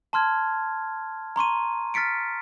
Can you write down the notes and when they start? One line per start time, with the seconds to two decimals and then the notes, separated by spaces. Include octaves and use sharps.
0.13 A5 C6 F6 G#6
1.36 A#5 C6 C#6 D#7
1.94 F6 A6 B6 C#7 D7